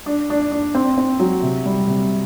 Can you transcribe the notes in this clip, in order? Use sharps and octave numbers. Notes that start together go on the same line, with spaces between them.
D4
D4
D4
C4
C4
F#3
C3
G3
C3